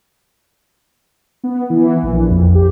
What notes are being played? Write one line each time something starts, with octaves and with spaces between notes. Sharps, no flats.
B3
E3
A#1
F2
G4